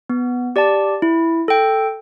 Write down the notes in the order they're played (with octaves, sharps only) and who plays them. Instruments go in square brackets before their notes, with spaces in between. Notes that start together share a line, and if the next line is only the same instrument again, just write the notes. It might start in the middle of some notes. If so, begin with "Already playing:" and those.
[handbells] B3
G4 D5 A5
E4
A4 G5